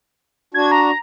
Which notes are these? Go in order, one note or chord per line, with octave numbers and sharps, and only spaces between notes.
D4 F#4 G#6
A#5